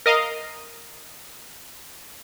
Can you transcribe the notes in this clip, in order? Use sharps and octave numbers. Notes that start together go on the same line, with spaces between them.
A#4 D#5 F5